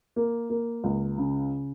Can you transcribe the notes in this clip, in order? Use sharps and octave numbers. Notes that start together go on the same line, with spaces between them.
A#3
A#3
C#2
C#3